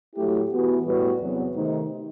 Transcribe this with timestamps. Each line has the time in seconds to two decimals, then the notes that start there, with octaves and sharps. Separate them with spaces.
0.15 A2 F#3 A3 E4 G4
0.50 E3 B3 F#4
0.84 A2 G3 B3 F#4 B4
1.18 E2 C3 F#3 B3
1.54 C3 D#3 A3 C4 D#4